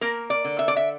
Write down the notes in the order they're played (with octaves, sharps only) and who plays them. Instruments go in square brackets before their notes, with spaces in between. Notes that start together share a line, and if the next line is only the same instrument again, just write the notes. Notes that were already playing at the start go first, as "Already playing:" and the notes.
[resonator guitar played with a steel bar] A#3 A#4
D5
D3
E5
D5
E5